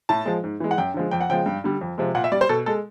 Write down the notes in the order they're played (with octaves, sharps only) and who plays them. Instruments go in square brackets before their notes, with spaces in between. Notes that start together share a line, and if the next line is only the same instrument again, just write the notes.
[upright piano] A2 A5
F3 G#3
G#2
E3 G#3
F#5
F#2 G5
D3 F3 G#3
F2 G5
F#5
C#3 F3 G#3 G5
G2
D3 G3
F2
C3 F3 G#3
A#2 F#5
E5
G3 D5
C5
B2 A4
G#3 A4